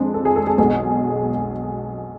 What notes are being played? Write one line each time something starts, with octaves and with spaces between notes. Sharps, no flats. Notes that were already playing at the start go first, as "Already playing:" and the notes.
Already playing: F2 F3 G#3 D4
A4
G#4
A4
G#4
B1 B2 G#3 G#4